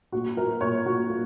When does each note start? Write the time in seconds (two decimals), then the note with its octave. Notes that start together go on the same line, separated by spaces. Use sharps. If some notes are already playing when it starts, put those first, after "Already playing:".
0.12 A#2 F#4
0.37 F#3 A#4
0.61 A#2 C#5
0.86 A#2 F#4
1.10 A#3